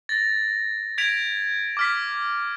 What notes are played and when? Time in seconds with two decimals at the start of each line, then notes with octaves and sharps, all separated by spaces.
0.09 A6 A#6
0.98 G#6 B6 D7 F7
1.77 D6 F6 B6